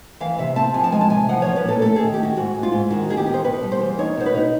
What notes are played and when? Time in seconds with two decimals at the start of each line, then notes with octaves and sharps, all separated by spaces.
0.20 E3 F5
0.38 C3 E5
0.56 C4 A5
0.74 F3 G#5
0.84 A5
0.92 G#3 G#5
1.01 A5
1.10 C3 G#5
1.29 F3 F#5
1.42 C#5
1.47 F3
1.56 B4
1.65 A#2 A4
1.82 A3 A4
1.96 D#3 G#4
2.14 G4
2.19 A3 F#4
2.36 G#2 F#4
2.55 G#2
2.63 F4
2.72 G#2
2.90 D#3 F#4
3.09 D#3 G#4
3.17 G4
3.26 B3
3.34 C5
3.44 B2 B4
3.63 G3
3.72 C5
3.81 E2
3.99 D#4 C#5
4.17 B2 C5
4.26 B4
4.34 D#4